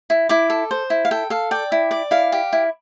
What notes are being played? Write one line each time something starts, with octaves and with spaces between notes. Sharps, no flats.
E4
E4 D6
A4
C5
E4
F5
A4 G5
A4 F5
D5 G5
E4
D5
E4 F5
G4
E4